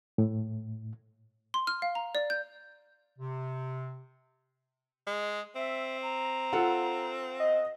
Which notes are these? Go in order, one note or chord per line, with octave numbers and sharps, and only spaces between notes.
A2
C6
F6
F5
A#5
D5
G6
C3
G#3
C4 E5
A#5
F4 A4 F#5
D#5